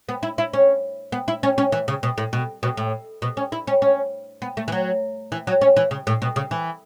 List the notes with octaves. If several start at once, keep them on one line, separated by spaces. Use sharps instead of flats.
B3
E4
E4
C#4
B3
E4
C#4
C#4
E3
C#3
B2
A2
B2
B2
A2
B2
C#4
E4
C#4
C#4
B3
A3
E3
F#3
E3
F#3
C#4
E3
C#3
A2
B2
C#3
E3